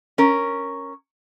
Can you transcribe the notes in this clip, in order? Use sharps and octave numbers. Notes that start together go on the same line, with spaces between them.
C#4 A#4